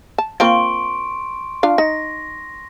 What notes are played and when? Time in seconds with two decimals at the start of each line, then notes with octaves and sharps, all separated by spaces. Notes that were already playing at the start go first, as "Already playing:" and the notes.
0.18 A5
0.40 A#3 C4 F4 C6 C#6 D7
1.63 D4 F4 F5
1.78 D#4 A#6